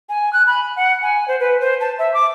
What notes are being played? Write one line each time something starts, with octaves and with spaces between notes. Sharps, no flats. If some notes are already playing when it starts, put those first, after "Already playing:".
G#5
F#6
B5
F#5
G#5
C5
B4
C5
A5
E5
D6